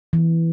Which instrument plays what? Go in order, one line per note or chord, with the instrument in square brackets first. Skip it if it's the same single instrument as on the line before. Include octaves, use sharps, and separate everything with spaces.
[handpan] E3